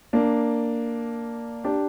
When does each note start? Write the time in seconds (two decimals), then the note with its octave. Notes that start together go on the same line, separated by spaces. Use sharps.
0.13 A#3 D4
1.64 D4 G4